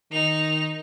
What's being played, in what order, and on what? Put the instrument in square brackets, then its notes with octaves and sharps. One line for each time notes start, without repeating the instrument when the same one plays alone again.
[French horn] D#3 [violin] D#4 F7